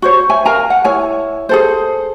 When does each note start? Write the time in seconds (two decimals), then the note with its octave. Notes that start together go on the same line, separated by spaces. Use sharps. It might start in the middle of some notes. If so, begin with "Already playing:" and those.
0.02 F#4 C5 C#5
0.29 C#5 E5 G#5
0.45 A#4 F5 G#5 A#5
0.70 F#5
0.84 E4 C#5 G#5
1.49 G#4 A4 C5